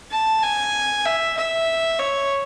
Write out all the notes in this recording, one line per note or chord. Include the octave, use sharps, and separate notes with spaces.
A5
G#5
E5
E5
C#5